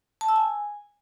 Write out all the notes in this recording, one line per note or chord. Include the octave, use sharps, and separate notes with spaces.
A5
E6
G#5